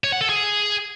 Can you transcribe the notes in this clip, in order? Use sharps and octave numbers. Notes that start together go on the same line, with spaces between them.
C#5
F#5
A4
G#4